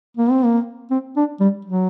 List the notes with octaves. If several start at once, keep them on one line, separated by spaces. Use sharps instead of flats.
A#3
C4
A#3
C4
D4
G3
F#3